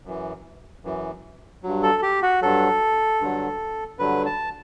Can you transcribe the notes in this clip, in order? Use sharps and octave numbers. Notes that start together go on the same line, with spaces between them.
F#2 E3
F#2 E3
G2 F#3
A4
G4
F#4
G2 F#3 A4
G2 D3 F#3
G2 D3 F#3 B4
A5